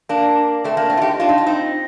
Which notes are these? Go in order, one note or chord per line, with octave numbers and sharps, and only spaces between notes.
A#3 D4
A3 C4
A#3 D4
A3 C4
F4
D#4 G4
D4 F4
D#4
F4
C4 D#4